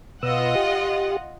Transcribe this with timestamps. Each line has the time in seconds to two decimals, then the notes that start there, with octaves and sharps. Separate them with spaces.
0.23 B2 F4 B4 D#5 F#5 E6
0.55 G4